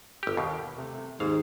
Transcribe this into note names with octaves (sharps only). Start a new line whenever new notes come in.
G1 G4
D#2 B2
C3 A3
D#2 G#2 D#3 F5